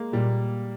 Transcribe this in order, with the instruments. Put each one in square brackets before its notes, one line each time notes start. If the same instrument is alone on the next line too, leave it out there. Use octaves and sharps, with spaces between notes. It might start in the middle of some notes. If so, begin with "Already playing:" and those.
Already playing: [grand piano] G#3 A#3
[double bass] A#2 [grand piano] G3